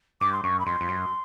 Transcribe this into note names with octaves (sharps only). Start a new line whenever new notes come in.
G2 D6
C6
F#2 C#6
B5
F2 C6
F2
F#2